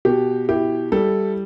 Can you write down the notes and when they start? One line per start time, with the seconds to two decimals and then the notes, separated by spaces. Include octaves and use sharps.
0.05 B2 G4
0.49 E4 G4
0.92 G3 A4